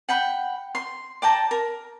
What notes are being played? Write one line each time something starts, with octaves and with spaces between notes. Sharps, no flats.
F#5 G5 B5
C6
D5 G5 A5 A#5
A#4